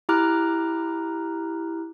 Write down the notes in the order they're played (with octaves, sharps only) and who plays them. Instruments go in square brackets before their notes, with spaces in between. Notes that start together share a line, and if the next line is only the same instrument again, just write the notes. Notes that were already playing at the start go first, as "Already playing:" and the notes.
[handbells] E4 G4 A#5 D6 F6 F#6